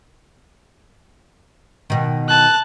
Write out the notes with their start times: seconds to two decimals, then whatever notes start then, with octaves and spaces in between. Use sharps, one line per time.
1.90 B2 D#3
2.29 A5 F#6